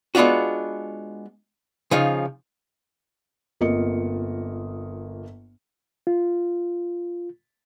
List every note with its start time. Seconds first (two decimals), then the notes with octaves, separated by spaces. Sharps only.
0.15 G#3 B3 D4 F4 F#4
1.91 C#3 F3 D#4 F4
3.61 G1 A#3 C4 F4 D#5 C#7
6.07 F4